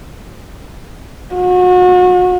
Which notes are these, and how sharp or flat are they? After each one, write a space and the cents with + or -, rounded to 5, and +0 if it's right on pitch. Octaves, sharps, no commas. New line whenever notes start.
F#4 -35